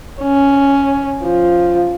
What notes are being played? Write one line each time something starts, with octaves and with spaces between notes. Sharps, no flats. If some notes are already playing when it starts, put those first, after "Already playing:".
C#4
F3